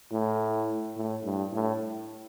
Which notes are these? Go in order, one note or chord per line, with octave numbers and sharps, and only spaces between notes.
A2
A2
G2
A2